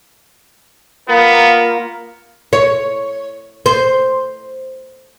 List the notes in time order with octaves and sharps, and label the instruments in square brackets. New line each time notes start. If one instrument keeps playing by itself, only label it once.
[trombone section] A#3 F4 A#4 [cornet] B3
[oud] C#5
C5